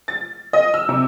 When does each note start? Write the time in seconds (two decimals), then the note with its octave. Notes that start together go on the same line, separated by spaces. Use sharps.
0.08 A6
0.53 D#5
0.74 E6
0.89 C3